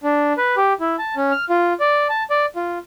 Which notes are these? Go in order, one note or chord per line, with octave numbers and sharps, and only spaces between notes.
D4
B4
G4
E4
A5
C#4
F6
F4
D5
A5
D5
F4